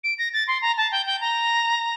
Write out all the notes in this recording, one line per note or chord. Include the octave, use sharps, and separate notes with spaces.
D7
A#6
A6
C6
A#5
A5
G5
G5
A#5